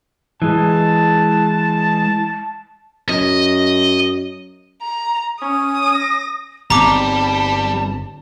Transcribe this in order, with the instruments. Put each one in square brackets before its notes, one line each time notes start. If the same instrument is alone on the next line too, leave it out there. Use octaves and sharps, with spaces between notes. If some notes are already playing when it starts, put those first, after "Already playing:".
[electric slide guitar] E3 G#3 [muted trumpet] A5
[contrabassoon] F#2 [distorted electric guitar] D#5
[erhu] A#5
[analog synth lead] C#4 [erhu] D#6
[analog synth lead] A#6
[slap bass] G1 C4 [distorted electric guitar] G3 [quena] A5 [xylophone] A#5 D6